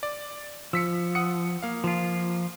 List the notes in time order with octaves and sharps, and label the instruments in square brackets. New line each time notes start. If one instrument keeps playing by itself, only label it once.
[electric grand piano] D5
[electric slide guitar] F3 [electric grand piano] E6 B6 C#7
[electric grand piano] F#5 D#6 C#7
A#3 F5
[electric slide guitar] F3 F4